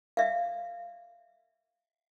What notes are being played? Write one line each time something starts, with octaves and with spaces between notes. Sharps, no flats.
E5 F5